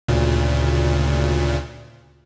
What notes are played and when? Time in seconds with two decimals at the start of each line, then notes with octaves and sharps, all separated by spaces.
0.08 D2 A#2 C#3